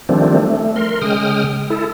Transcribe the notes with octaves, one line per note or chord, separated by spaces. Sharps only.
D#3 F3 G3 A3 C4 D4
A3
A#4 C6
C#3 G#3 G5 D#6 F6
E4 A4